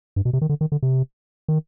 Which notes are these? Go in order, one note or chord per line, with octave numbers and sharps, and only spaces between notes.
G2
B2
C3
D#3
D3
D#3
D3
C3
D#3